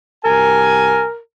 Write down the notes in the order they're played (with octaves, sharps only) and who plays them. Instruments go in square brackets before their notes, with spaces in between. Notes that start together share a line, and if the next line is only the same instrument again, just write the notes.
[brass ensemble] C2 G4 G#5 [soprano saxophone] A#4